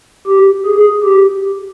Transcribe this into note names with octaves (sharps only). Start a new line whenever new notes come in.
G4
G#4
G4